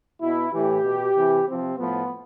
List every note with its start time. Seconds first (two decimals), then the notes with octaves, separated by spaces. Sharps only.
0.22 B2 E4
0.53 A2 E3 G4
0.84 B2
1.16 C3 E3
1.47 C3 F3 C4
1.78 A2 F3 B3